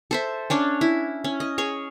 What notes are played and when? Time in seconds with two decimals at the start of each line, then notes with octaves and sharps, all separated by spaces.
0.11 A4 C5 E5
0.50 C#4 D4 C#5
0.81 E4
1.24 C#4
1.40 D#5
1.58 G#4 C#5 C#6